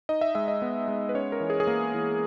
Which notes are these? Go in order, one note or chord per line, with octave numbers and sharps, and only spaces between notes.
D#4 D#5
E5
G#3 E5
D#5
B3
G#3
B4
C#4 C#5
A#4
E3
G#4
G#4
A#3 A#4
E3